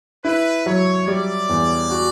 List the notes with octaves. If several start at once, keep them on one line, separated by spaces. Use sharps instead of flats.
E4 B4
F#3 C#5
G3 D5
E2
F#4